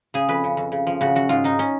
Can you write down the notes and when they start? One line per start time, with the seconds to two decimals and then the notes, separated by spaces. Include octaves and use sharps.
0.14 C#3 G#4
0.29 F2 B4
0.44 C#3
0.57 F2
0.72 C#3
0.87 F3
1.01 C#3 F#4
1.15 F#2 F#4
1.29 G#2 F4
1.44 G#2 D#4
1.59 C#4